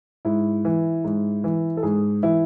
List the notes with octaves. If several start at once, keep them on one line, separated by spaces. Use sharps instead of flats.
G#2 E4
E3
G#2
E3
A4
G#2 G#4
E3 E4